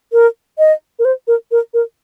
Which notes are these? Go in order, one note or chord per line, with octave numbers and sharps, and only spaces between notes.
A#4
D#5
A#4
C5
A#4
A#4
A#4